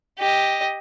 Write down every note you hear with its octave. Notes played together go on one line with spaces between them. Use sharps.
G4 D#5